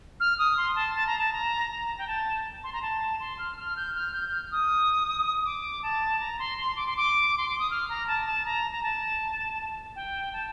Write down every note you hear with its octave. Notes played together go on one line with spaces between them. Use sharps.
F6
D#6
C6
A5
A5
A#5
A5
A#5
A#5
G5
A5
C6
A#5
A5
C6
F6
F6
G6
F6
G6
F6
D#6
D6
A5
A#5
C6
C6
D6
C6
D6
C6
D6
D#6
F6
A#5
A5
A5
A#5
A#5
A5
G5
A5